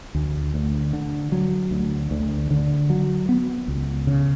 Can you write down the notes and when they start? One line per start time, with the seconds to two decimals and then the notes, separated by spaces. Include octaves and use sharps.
0.15 D2
0.54 D2
0.93 D3
1.32 F#3
1.71 D2
2.11 D2
2.51 D3
2.90 F#3
3.29 B3
3.68 C#2
4.07 C#3